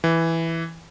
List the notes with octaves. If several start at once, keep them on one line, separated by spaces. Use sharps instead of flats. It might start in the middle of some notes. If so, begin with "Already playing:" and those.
E3